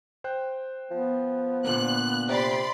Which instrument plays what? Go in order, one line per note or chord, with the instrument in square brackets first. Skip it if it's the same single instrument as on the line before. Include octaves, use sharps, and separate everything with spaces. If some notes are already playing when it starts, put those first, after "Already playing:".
[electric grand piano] C5 G5 F#6
[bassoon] F3 [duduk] B3
[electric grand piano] A#2 D3 A#3 [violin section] F#6
[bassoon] C3 [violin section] D5 B5 C6